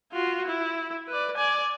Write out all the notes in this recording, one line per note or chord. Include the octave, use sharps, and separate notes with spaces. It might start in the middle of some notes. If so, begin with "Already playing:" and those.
F4 F#4
E4
B4 D5
D5 G#5